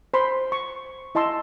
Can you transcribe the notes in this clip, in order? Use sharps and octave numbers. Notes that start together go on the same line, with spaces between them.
C5 B5 C6
C#6
E4 D#5 A5 C6 E6